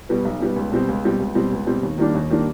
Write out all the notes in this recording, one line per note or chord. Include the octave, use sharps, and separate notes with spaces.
B2 G3 B3
B1
B2 G3 B3
C#2
B2 G3 C4
C#2
B2 G3 C4
C#2
B2 G3 C4
C#2
B2 G3 C4
D#2
D#3 G3 A#3 D4
D#2
D#3 G3 A#3 D4